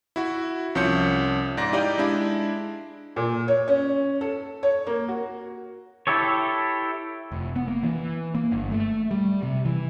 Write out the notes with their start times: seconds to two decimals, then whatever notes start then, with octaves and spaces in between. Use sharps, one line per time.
0.16 E4 F#4
0.75 C2 F3 C#4 G6 C#7
1.57 G#2 D5 A#6
1.73 D#4 E4 G4 D5 D#5 F5
1.98 G#3 D4 E4
3.16 A#2
3.48 C#5
3.68 C#4
4.21 A4
4.63 C#5
4.87 A#3
5.08 F#4
6.07 E4 G4 A4 C#5
7.32 F1
7.56 B3
7.68 A#3
7.83 E3
8.35 A#3
8.52 G1
8.72 A3
9.11 G3
9.43 C3
9.65 E3